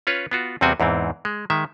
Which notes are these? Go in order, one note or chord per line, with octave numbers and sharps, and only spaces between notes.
C#4 F4 B4 C#5
B3 F4 F#4
E2 C3 G3 C4 F#4 G#5
E2 G#2 E3 C4
G#3
D#3 G#3 E5